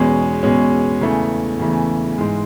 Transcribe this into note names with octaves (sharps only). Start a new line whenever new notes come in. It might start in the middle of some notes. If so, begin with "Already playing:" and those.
Already playing: E2 B2 G#3 C#4
E2 B2 G#3 C#4
E2 C#3 E3 A3
E2 C#3 E3 A3
G#2 E3 G#3